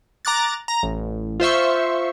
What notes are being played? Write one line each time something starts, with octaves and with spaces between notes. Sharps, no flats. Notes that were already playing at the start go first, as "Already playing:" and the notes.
A#5 D6 F#6 A6
A#5
A1
F4 C5 E5 C#6